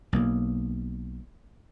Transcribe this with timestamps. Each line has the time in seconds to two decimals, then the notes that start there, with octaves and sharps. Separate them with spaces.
0.13 B1 A#3